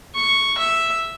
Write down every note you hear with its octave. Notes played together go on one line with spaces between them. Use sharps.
C#6
E5